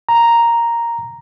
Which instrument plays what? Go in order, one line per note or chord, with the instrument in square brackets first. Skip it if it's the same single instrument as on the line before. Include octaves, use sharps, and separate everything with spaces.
[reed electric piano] A#5